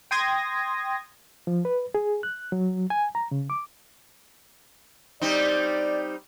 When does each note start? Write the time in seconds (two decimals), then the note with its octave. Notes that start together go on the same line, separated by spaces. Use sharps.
0.11 G5 C6 D#6 G#6 A#6
1.47 F3
1.65 B4
1.95 G#4
2.23 F#6
2.52 F#3
2.90 G#5
3.15 A#5
3.31 C#3
3.50 D6
5.22 G3 C4 D#4 D5